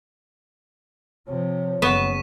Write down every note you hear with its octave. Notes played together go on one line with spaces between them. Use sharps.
C3 F3 C#5
F#1 B3 C#6 B6 E7